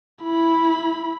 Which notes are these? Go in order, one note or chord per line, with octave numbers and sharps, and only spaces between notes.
E4 B5